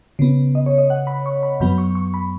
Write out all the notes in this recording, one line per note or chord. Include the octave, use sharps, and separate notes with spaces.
C#3 B3
D#5
C#5
D#5
F#5
B5
C#6
B5
F#2 F#3 B3 B5
C#6
C#6
B5